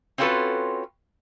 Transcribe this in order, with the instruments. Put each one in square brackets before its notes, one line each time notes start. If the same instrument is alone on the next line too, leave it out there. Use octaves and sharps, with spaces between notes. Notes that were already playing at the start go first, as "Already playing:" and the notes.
[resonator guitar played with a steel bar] C4 C#4 F4 F#4 A4 B4